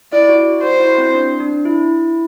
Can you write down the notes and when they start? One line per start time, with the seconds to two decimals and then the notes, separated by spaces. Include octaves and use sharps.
0.12 E4 D5
0.29 F#4
0.63 F#4 C5
0.80 E4
0.98 C4
1.14 D4
1.40 D4
1.65 E4